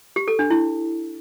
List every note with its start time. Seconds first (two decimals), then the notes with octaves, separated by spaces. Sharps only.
0.16 G4
0.28 A4
0.39 D4
0.50 E4